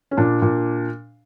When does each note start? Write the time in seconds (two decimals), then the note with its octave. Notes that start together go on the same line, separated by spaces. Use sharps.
0.11 C#4
0.17 A#2 D4
0.42 A#2